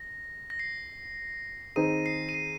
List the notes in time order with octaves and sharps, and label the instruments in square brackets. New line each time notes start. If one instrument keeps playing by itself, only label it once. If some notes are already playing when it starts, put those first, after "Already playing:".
Already playing: [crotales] A#6
A#6
C7
[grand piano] D#3 C4 D#4 G#4 [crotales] D#7
[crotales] C7
D#7
C7